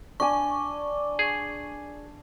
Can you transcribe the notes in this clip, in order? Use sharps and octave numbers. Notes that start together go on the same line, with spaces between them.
D4 D5 G#5 C#6
G#4